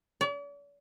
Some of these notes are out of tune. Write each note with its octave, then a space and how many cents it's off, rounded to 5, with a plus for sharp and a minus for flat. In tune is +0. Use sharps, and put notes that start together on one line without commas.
D5 -45